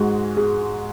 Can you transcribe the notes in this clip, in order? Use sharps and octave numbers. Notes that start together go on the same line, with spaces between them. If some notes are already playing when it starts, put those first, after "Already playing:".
Already playing: G#2 G#3 F#4 G#4
G#4